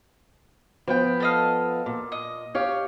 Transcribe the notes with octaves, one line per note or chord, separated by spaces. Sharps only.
F3 B3 G5
A4 D#5 F5
A#2
D#5
G4 C#5 F5